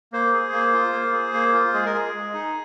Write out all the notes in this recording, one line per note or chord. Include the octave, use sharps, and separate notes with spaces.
A#3 C5
G#4
A#3
F4
A#3
G#4
A#3
F4
G#3 G#4
A#4
G#4
G#3
D#4